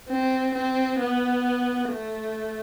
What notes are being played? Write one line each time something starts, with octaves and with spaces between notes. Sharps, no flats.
C4
C4
B3
A3